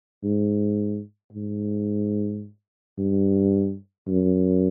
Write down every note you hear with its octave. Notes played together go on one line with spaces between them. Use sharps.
G#2
G#2
G2
F#2